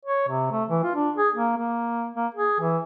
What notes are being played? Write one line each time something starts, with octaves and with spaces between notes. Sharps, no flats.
C#5
C3
A3
E3
F4
D4
G#4
A#3
A#3
A#3
G#4
E3